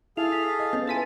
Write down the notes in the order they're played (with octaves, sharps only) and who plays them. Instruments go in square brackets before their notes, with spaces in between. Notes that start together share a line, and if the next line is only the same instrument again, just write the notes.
[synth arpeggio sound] E4 [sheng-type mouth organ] G#4 A4 F5 [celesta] F7
[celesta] B6
D#5
[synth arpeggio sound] B3 C#4 [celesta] A6
[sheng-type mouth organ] E4 F4 A4 [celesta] B4 G#5 [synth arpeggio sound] A6 B6 D#7